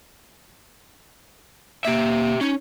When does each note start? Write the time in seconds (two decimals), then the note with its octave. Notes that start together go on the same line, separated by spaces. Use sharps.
1.85 A#3 G4 E5
2.41 C#4 D#4